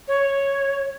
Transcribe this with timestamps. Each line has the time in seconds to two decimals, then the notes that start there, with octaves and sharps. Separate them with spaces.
0.08 C#5